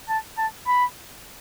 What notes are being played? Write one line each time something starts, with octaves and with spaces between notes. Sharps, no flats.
A5
A5
B5